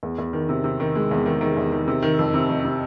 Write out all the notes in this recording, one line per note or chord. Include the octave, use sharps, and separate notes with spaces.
E2
E2
D#3
C3
C3
D#3
G#3
E2
D#3
D#3
E2
D#3
C3
D#3
F2
C3
F2
C3